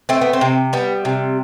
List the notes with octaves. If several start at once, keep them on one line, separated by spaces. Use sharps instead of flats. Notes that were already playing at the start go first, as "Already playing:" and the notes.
A3 C4
B3
C4
C3
G3 B3
C3